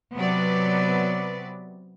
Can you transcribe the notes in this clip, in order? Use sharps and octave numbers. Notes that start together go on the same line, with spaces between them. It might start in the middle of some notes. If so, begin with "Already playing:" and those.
C3 F#3 B3 B4 D5